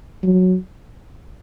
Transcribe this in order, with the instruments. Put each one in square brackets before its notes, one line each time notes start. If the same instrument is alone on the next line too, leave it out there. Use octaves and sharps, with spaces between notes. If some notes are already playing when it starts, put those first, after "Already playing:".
[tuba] F#3